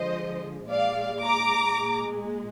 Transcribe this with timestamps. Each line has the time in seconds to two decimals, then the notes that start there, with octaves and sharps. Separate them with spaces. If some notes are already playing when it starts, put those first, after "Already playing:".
Already playing: D3 F3 G#3 C5 D#5
0.70 A#2 G#3 D5 F5
1.22 A#5 D6
1.74 A#2 G#3